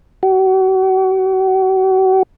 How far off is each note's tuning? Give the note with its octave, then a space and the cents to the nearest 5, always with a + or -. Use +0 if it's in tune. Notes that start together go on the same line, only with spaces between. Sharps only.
F#4 +40